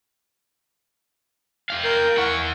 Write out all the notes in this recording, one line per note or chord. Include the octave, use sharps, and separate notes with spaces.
G4 F5
A#4 G6
E4 F#5 C#6